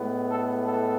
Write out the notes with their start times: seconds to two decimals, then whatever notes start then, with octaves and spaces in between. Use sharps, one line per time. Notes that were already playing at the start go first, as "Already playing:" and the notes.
Already playing: A2 G#3 B3
0.30 A4
0.66 A4